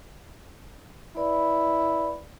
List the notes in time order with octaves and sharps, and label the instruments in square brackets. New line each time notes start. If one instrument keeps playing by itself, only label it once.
[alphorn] E4 [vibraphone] B4 D5 B5